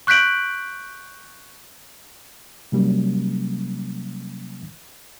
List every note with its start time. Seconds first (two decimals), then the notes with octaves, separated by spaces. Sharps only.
0.07 C#6 F#6 G6 B6 D7 F#7
2.72 C3 F#3 G3 A#3 C#4